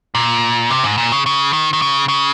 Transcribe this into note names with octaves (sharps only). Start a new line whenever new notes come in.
A#2
C3
G#2
A#2
C#3
C#3
D#3
D#3
C#3
C#3